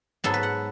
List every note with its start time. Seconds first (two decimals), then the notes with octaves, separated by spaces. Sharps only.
0.24 G#2 F#3 B3 A4
0.34 B4
0.43 F#5